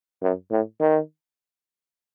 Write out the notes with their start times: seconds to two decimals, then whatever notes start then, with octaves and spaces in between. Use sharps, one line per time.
0.22 F#2
0.51 A2
0.80 D#3